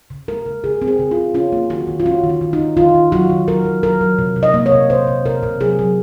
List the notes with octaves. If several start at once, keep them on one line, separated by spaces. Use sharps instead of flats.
C#3
G#3 A#4
C#3
C#3 G#4
C4
G#4
C#3
F4
C#3
C#4 F4
A#3
D#3 F#4
D#3
F4
C#4 F#4
D#3
F4
D#3
D#4
D#3
D#3 F4
D#3
F#3 F#4
D#3
F#3 A#4
F#3
F#3 A#4
F#3
C3
C3
D#5
A#3
C#5
C3
C3 C5
C3
C3 A#4
C3
F#3 G#4
F#3